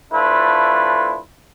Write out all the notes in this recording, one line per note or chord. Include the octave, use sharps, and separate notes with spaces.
F3 A3 D4 E4 F4 B4